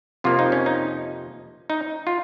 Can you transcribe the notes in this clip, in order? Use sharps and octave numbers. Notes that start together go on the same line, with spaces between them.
F2 C3 F3 A#3 F4
D#4
C#4
D#4
D#4
F4